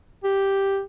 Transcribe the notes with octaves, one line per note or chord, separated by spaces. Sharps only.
G4